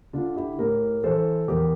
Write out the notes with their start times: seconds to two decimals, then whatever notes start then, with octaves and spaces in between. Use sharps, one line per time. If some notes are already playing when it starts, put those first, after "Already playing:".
0.13 D3 D4 F4
0.36 E4 G4
0.59 A2 G4 A#4
1.04 E3 A4 C5
1.48 E2 G4 A#4